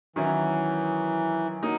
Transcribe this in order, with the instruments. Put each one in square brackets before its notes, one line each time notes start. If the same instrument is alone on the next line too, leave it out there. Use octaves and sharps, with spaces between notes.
[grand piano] D#3 F#3 C#4 E4 [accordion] E3
[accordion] F#3 [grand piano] A#3 D#4